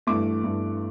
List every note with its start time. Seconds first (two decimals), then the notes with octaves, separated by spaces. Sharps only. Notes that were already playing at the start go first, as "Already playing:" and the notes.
0.07 G2 E3 A3 D6
0.44 G2 E3 A3